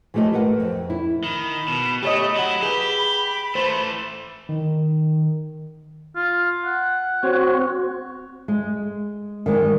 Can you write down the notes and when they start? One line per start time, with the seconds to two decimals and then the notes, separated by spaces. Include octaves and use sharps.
0.14 E3 F3 A3 G4 D#5
0.32 A3 A#4 B4 F#5
0.60 F2
0.90 E4
1.24 D#3 B5
1.68 B2
2.03 A3 G4 C#5 D#5 B5
2.36 F#3 E4 F#5 A#5
2.63 G4 G#4 B4
3.55 E3 A3 C5
4.49 D#3
6.16 F4
6.65 F#5
7.23 C4 F#4 C#5
8.48 G#3
9.46 D#3 G3 G#3